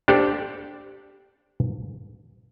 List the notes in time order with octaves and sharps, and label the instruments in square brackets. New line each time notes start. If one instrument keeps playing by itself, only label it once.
[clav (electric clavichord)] D4 G4 A4 C5 D5